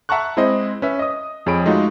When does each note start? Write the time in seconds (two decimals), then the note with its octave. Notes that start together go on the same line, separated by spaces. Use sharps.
0.09 E5 F#5 A5 A#5 C#6 F#6
0.37 G#3 C4 E4 C5 D#5
0.82 C#4 B4 E5
0.99 D#5 D#6
1.46 F2 G#4 C#5 B5 D7
1.66 G#3 A3 D#4 F4 F#4